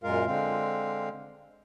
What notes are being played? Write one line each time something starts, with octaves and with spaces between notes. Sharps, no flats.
F#2 A#2 G#3 F4 A#4 F5
D3 G#3 C4 F5